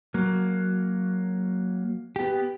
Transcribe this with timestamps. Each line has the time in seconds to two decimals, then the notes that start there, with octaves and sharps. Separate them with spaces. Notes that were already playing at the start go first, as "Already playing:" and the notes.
0.14 F#3 A#3
2.16 B3 G4